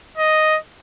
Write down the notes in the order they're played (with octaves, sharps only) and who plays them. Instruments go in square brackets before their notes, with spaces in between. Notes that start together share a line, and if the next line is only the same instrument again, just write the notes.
[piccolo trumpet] D#5